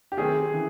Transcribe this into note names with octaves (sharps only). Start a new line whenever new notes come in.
G4
D#3 F#3 A3 C4 G#4
C#3 E3